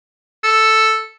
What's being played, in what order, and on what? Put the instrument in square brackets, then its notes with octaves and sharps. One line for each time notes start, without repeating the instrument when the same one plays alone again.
[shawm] A4